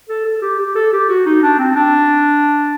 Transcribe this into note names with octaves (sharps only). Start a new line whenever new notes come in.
A4
A4
G4
G4
A4
G4
F#4
D#4
D4
C4
D4